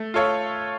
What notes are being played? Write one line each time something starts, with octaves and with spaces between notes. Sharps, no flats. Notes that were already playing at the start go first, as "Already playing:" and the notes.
Already playing: A3
F4 A4 C#5 F5